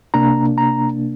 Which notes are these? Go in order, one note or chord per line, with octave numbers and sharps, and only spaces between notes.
C3 A#3 D4 A#5
A#5